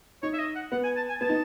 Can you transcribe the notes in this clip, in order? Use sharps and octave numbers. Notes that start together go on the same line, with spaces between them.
D#4 C#5
E5
D#5
F#5
B3 F#5
G#5
A5
G#5
B3 A5
D#4